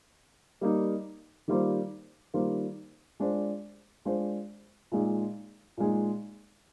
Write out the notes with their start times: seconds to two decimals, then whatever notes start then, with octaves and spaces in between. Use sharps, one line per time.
0.61 G3 A#3 D#4
1.48 D#3 G3 A#3 F4 C5
2.34 D#3 G3 A#3 F4 C5
3.20 G#3 D4 F4 C5
4.05 G#3 D4 F4 C5
4.92 A#2 G#3 D#4
5.77 A#2 G#3 D#4